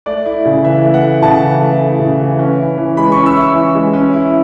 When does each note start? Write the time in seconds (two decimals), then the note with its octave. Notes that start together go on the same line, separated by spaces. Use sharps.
0.06 A3 D5
0.26 E4
0.45 C#3
0.64 E3 E5
0.83 A3
0.94 F#5
1.03 E4
1.22 C#3 A5
1.42 E3
1.62 A3
1.80 E4
1.99 C#3
2.19 E3
2.39 C#4
2.58 E4
2.77 E3
2.97 G#3 B5
3.12 C#6
3.17 C#4
3.26 E6
3.36 E4 C#6
3.55 E3
3.75 G#3
3.93 C#4
4.13 E4